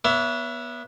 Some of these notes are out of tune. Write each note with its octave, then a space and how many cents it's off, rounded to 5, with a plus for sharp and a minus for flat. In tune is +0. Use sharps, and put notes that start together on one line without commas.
B3 -20 C#5 +35 E5 +20